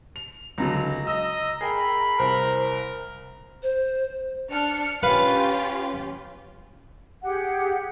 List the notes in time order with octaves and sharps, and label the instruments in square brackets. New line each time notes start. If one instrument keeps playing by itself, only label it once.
[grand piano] F7
[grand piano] C#2 D3 F#3 [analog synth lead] A#5
[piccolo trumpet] D#5 [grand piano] E6
[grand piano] G#4 A#4 G5 [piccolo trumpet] B5
[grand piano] C2 [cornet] A#4 [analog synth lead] C5
[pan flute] C5
[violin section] D4 F6 C#7
[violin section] C#4 F4 G4 [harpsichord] B4 F5
[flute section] G4 G#4 F#5